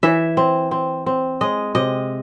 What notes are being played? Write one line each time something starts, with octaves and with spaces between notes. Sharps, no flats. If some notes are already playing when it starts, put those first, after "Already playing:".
E3 E5
C4
C4
C4
G#3 D#5
C3 D#5